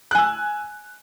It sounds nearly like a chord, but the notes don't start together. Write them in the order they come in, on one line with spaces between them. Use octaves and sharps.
F#6 G#5 E6